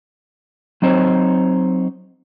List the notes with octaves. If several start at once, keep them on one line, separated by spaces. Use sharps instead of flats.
F#3 C4 D#4 C5 C#5